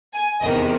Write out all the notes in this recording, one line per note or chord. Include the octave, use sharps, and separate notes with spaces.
G#5
E2 C3 D#3 D#5